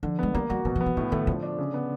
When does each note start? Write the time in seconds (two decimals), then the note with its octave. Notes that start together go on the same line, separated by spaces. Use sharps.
0.03 D3 F3
0.19 G#3 B3
0.34 G3 A#3
0.49 G3 F#4
0.65 B2 F#3
0.76 F3
0.81 B3
0.86 F3
0.97 A2 D#3
1.12 D#3 A3
1.27 D3 F3
1.43 D4
1.58 C#3
1.74 B3